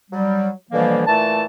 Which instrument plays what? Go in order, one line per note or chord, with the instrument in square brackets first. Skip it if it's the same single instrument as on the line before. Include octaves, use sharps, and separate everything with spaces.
[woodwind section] F#3 G3
B2 D3 E3 F3 G3 A#3
A#2 E3 A3 A5